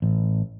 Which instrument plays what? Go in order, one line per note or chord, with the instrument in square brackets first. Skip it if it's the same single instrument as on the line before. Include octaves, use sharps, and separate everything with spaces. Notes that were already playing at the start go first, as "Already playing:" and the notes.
[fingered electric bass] A1